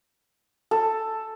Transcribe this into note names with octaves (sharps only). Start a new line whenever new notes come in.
A4